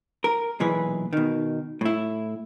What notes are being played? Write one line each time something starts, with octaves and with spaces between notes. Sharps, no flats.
A#4
B1 A#2 E3 G#4 B4
B2 D#3
A2 E4